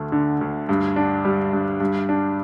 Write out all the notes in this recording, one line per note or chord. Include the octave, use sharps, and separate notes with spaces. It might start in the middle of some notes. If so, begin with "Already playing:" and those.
Already playing: D2 A3
D3
D2
G2
D4
G3
G2
G2
D4